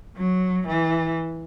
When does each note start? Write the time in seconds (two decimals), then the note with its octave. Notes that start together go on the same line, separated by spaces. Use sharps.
0.16 F#3
0.67 E3